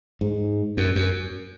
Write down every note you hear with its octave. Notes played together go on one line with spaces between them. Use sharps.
G#2
F#2
F#2